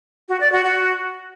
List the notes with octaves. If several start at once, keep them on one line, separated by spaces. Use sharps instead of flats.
F#4
D5
F#4
F#4